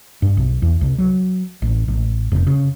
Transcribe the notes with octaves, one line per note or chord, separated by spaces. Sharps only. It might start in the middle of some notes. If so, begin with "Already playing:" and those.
G2
B1
E2
C2
F#3
A1
A1
F1
C#3